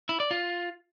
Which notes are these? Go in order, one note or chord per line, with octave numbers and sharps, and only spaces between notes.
E4
D5
F4